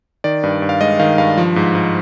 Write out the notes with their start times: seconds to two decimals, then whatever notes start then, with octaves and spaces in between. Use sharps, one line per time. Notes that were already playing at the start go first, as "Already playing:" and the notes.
0.24 D#3 D5
0.43 G2
0.62 G2
0.69 F5
0.81 G#3 D#5
0.99 D#3 F5
1.18 G2 F5
1.37 F3
1.56 G#2
1.75 G#2